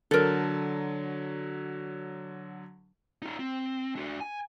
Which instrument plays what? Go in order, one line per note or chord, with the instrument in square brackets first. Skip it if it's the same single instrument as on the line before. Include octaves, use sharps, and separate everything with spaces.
[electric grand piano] D3 F#3 [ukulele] A4 A#4
[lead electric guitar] D#4 F4
C4
D4 F#4
G#5